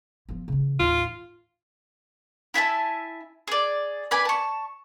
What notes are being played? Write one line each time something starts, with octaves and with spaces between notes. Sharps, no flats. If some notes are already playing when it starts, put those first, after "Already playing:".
F3 B3
C#3 E3
A1 D#2 F4
E4 E5 G#5 A5
G#4 D5
B4 D5 G#5 B5
A5 C#6